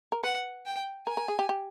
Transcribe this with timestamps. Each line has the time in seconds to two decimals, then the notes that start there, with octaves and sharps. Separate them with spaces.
0.12 A#4
0.23 B4 F#5
0.66 G5
1.07 A#4 G#5
1.17 A#4
1.28 G#4
1.39 G4
1.49 G4